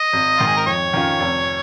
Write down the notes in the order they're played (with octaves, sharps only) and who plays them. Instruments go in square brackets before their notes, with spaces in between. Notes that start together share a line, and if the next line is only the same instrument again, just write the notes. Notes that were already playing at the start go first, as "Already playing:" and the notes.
Already playing: [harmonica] D#5
[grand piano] G#1
[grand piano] G#2 D#3 [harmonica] F4
[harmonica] G#4
A#4
[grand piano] F2 [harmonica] C#5
[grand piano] D#3 C#4 F4
F1